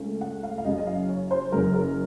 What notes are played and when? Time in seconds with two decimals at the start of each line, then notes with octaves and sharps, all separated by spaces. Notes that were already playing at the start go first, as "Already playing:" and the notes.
Already playing: C#2 C#3 A3 C#4
0.21 F#5
0.43 F5
0.58 F5
0.65 F#1 F#2 C#3 F#3 D#5
0.78 D#5
0.87 F5
1.09 C#5
1.31 C5
1.52 F#1 F#2 C#3 F#3 A#4
1.74 A#4